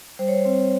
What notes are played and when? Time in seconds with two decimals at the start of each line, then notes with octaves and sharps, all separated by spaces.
0.19 G3 C5
0.28 C#5
0.38 C5
0.45 C4